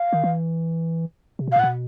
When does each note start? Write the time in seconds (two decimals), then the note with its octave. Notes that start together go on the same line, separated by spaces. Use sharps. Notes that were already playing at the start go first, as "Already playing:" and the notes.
Already playing: F5
0.13 D#3
0.24 E3
1.39 C3
1.47 B2
1.52 F5
1.56 A#2
1.60 F#5
1.63 B2